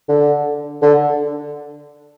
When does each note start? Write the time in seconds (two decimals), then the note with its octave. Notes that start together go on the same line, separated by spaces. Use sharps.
0.09 D3
0.82 D3